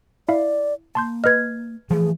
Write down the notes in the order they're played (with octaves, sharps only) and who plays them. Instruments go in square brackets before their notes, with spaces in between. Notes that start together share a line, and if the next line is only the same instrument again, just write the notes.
[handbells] E4 E5 F5 [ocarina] D5
[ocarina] A#3 [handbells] A5 C6 G6
[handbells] B4 D#5 [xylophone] F6 G#6
[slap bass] E3 F3 A3 [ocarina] G#4